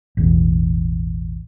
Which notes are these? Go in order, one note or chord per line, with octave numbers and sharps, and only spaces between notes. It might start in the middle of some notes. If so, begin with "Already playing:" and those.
A1 E2 B2